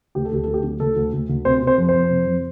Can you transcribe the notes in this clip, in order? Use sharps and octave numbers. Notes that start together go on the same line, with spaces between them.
D2 G4
A4
D2 G4
D2 A4
G4
D3
D2 A4
D2
D2
D2
C3 C5
C3
C5
F2
C5
F2
C3
F2